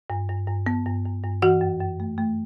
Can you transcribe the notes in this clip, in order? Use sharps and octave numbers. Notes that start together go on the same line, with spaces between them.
G2
G2
G2
B3
G2
G2
G2
E3 F#4 F#5
F#2
F#2
A3
A3